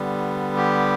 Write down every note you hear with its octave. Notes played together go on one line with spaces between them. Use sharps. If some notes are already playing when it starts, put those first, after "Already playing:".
Already playing: D3 G3 B3
G4